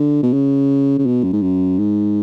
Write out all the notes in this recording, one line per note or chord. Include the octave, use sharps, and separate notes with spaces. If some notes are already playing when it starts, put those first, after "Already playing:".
Already playing: D3
B2
C#3
C#3
B2
F#2
G#2
F#2
G#2